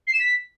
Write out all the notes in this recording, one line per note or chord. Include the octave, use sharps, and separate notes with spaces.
C7
E7
B6